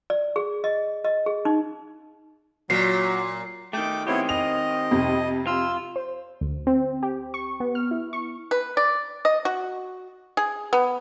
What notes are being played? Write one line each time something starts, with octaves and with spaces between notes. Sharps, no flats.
D5
G#4
D#5
D#5
G#4
D#4
A#2 F#3 C7
D#3 A3 G5 D6
D#3 B3 C4 E4 G4 C#5
D#5 F7
F2 C3
F4 E6
C5
D2
C4
G4
C#6
B3
F6
E4
C#6
B4
D5
D#5
F#4
G#4
B3